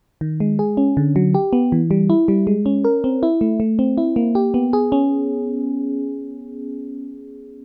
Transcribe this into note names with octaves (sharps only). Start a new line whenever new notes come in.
D#3
G#3
G#4
C#4
D3
F#3
G4
B3
E3
G3
E4
G3
G#3
C#4
A#4
C4
E4
A3
A3
C4
E4
A#3
G4
B3
G#4
C#4